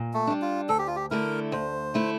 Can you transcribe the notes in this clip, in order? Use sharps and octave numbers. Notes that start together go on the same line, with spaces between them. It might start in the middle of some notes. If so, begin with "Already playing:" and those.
Already playing: A#2
A3
G3 D4
F4
D2 A4
G4
F4
G4
D3 A3 E4 A#4
D2 C5
D3 A3 E4